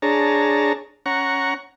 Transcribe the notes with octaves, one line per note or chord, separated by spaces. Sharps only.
D4 G#4 C#5 A5 A#5
C#4 F#5 A#5 C#6